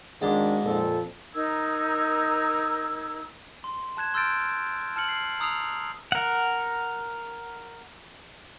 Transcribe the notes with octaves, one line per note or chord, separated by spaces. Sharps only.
G#1 G#2 D#3 D4
F2 A#2 A4
D#4 A#4 E6 G#6
C6
A5 F#6 G#6 E7
C6 E6 F6 G6 A6 D7
A5 F6 C#7 F#7
C7
A#5 D#6 E6 C7 F7
A#4 F#5